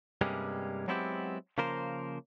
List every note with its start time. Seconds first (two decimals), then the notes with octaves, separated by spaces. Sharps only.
0.21 G2 C3 G3 G#3 A#3 C#4
0.88 F#3 G#3 B3 C4 E4 G4
1.58 C#3 F3 A#3 A#4 C5